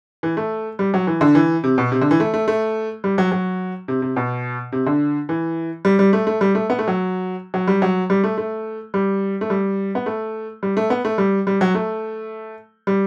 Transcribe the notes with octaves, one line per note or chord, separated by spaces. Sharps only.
E3
A3
G3
F#3
E3
D3
E3
C3
B2
C3
D3
E3
A3
A3
A3
G3
F#3
F#3
C3
C3
B2
C3
D3
E3
G3
G3
A3
A3
G3
A3
B3
A3
F#3
F#3
G3
F#3
G3
A3
A3
G3
A3
G3
B3
A3
G3
A3
B3
A3
G3
G3
F#3
A3
G3